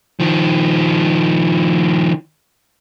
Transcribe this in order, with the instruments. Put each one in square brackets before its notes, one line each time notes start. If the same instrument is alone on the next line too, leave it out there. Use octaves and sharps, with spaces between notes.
[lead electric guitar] D#3 F3